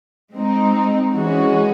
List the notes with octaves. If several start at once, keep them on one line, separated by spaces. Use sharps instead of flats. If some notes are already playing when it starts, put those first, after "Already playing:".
G#3 C4 D#4
E3 G#3 C#4 F#4